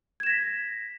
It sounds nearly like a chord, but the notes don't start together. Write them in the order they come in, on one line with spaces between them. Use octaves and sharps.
G#6 E7 A#6 B6